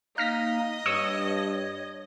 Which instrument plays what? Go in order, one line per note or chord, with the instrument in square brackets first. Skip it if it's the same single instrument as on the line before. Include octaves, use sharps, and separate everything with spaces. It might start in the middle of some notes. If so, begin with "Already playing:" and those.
[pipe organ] A#3 D#4 [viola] D#5 [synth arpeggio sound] F6 A#6 B6
[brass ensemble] G2 [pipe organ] C#5 [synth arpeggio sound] C#6 D#6 E6